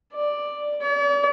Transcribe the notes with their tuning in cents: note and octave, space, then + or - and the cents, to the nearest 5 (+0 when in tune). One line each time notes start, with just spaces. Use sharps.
D5 +5
D5 -45